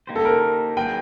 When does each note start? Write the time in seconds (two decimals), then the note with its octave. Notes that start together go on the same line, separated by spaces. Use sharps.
0.07 A#3 D#4 G4 C5
0.16 A4
0.25 A#4
0.77 F#3 A#3 D#4 G#4 B4 G5